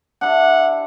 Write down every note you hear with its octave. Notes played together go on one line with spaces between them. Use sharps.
D4 E4 G4 F#5